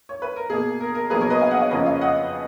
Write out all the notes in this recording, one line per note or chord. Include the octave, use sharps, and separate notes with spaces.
C#5
B4
A#4
B2 A#3 G#4
A#4
A#4
B2 F#3 A#3 G#4 B4
A#4 C#5
B4 D#5
F5 G#5
D#5 F#5
C#5 F5
F2 C#3 F3 A#3 B4 D#5
C#5 F5
D#5 F#5